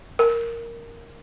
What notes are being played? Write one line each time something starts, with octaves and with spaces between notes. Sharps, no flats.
A#4